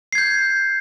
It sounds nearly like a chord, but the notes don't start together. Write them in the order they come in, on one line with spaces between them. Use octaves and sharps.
C7 G#6 G6